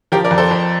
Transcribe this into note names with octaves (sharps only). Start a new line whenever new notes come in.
F3 G4 A#4
A#4 D5
F2
A4 C5
F2